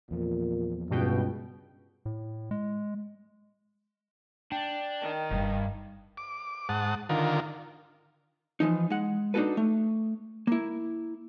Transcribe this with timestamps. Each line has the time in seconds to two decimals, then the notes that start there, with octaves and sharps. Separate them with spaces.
0.11 E2 A#2 F3
0.90 C#2 G2 B2 G5
2.05 A2
2.51 G#3
4.52 D4 G5
5.02 D#3
5.31 F#1 D2 G2
6.17 D6
6.69 G#2 F#5 A5 D#6
7.09 D3 D#3 F4 A#4
8.60 E3 F3 D#4
8.90 G#3 F#5
9.34 D4 D#4 F4 F#4 A4 B4
9.57 A3
10.47 A#3 E4